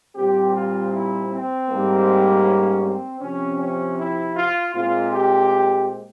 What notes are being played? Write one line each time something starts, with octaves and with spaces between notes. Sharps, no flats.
A#2 G3 C4 G4
F4
E4
C4
G#2 G3 A#3
C#4
C4
C3 F3 C4 C#4
C#4
E4
F4
A#2 G#3 C4 F4
G4